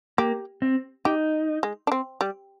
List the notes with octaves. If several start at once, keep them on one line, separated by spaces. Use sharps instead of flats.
A#3 G4
C4
D#4 G4
G#3
D4
C4
G3